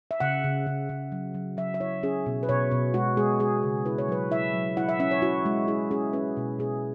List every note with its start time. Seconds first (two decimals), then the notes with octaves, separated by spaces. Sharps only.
0.11 E5
0.20 C#3 F#5
0.44 C#3
0.66 C#3
0.89 C#3
1.12 F#3
1.34 F#3
1.57 F#3 E5
1.74 E5
1.80 E4 C#5
2.03 C#4 G#4
2.26 B2
2.43 B4
2.49 B2 C#5
2.71 B2
2.94 G#3 F#4
3.17 G#3 G#4
3.40 G#3 G#4
3.63 C#3
3.85 E4 B4
3.98 C#5
4.08 F#3 B4
4.31 E4 E5
4.54 F#3
4.77 E4 F#5
4.89 E5
5.00 C#4 E5
5.11 C#5
5.22 E4 F#4
5.45 G#3
5.68 E4 G#4
5.91 C#4 G#4
6.13 C#4 B4
6.37 B2
6.59 B2 G#4